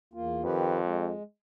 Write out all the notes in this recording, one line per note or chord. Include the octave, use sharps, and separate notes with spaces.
E2 A#3 F4
F2 D#3 G4 B4
G#3